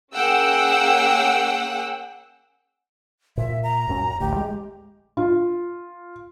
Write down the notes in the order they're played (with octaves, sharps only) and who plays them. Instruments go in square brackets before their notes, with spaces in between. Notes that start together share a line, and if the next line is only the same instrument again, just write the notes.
[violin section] A#3 C#4 G#4 F#5 G5 E6
[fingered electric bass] A#2 [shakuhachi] E5
[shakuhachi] A#5
[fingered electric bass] D#1 F#2 C#4
[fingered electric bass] A1 D2 [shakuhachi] G4
[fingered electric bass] G#3
[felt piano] F4